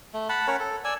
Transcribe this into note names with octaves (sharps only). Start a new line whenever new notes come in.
A3
F#5 A5 B5
C#4 A#4 C#5 F#5
A4
D5 G#5 E6